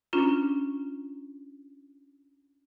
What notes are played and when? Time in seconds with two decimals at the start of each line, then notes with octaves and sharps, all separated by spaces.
0.13 C#4 D4 F4 A#5